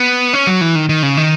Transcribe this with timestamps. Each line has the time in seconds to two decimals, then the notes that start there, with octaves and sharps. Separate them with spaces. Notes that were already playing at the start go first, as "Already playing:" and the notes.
Already playing: B3
0.33 C#4
0.47 F#3
0.61 E3
0.75 D#3
0.89 D#3
1.03 C#3
1.17 D#3